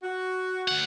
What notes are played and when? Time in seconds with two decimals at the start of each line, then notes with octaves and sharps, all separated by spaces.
0.03 F#4
0.68 D2 F#5